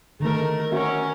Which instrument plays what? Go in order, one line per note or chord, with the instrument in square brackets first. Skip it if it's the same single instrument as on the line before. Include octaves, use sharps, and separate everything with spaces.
[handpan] D3 D#3 D#4 [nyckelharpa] A3 A#4
[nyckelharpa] C#4 A#4 [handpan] F#4 E5